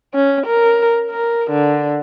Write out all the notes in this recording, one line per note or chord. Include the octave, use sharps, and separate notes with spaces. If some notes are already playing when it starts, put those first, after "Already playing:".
C#4
A#4
A#4
D3